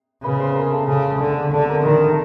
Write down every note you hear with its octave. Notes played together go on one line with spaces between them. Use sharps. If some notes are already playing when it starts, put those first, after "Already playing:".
C#3 B4 B5
C5 C6
A#4 A#5
A4 A5
C#3 A4 A5
D3 A4 A5
D3 A4 A5
A#4 A#5
D#3 A#4 A#5
A4 A5